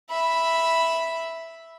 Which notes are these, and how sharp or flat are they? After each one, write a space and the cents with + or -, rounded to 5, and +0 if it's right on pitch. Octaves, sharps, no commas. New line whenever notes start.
E5 +0 B5 +0